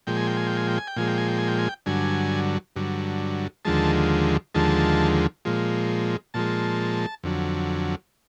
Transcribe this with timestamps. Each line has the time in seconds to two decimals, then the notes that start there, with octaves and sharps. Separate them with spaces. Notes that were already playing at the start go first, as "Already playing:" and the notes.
0.07 A#2 F3 G#3 G5
0.17 G#5
0.27 G5
0.37 G#5
0.47 G5
0.57 G#5
0.68 G5
0.78 G#5
0.87 G5
0.96 A#2 F3 G#3 G#5
1.08 G5
1.18 G#5
1.28 G5
1.38 G#5
1.48 G5
1.59 G#5
1.69 G5
1.86 G2 D3 F#3 G#5
2.76 G2 D3 F#3
3.65 D#2 D3 F3 G#3 A5
4.55 D#2 D3 F3 G#3 A5
5.45 A#2 F3 G#3
6.34 A#2 F3 G#3 A5
7.23 F2 D3 F#3